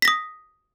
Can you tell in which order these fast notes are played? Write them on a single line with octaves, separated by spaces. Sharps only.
B6 A#6 D#6